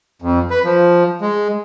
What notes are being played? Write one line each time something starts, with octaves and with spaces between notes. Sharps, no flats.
F2
B4
F3
G#3